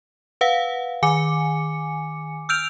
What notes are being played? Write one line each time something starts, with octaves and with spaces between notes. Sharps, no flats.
B4 F5 F#5
D#3 G#5 D6 C#7
E6 F6 G6 D7 F7